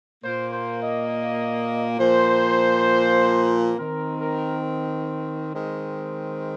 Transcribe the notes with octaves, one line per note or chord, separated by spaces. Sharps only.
A#2 A#3 C5
C5
D#5
A#2 F3 A#3 C5
D#3 C4 A#4
A#4
D#3 G#3 C4